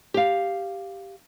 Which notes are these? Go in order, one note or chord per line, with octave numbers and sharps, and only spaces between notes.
G4 F5